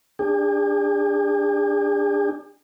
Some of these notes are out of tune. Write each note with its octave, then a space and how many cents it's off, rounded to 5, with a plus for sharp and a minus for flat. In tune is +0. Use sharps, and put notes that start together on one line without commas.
D4 +0 G#4 -45